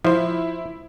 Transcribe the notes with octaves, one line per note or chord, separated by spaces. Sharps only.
F3 E4 C5